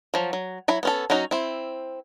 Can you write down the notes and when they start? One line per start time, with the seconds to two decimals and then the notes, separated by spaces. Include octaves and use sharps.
0.14 F3 F#3
0.33 F#3
0.68 F#3 E4 B5
0.83 B3 C#4 A4
1.10 F#3 C#4 D#4 F#4
1.31 C4 E4